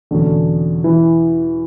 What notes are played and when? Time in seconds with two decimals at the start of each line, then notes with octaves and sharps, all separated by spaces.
0.11 E2 B2 D3 F#3 C#4
0.84 E3